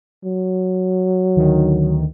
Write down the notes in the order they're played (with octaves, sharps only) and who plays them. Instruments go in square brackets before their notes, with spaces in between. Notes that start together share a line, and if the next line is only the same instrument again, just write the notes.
[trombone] F#3
[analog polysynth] D2 D#3